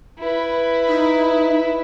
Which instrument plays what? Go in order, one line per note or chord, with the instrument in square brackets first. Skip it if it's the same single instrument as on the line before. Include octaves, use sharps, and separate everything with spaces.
[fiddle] E4 B4
[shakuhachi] D#4